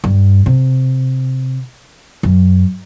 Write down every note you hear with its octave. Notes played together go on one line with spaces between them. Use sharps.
G2
C3
F#2